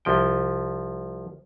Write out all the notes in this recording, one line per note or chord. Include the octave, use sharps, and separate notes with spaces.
C2 F3 G5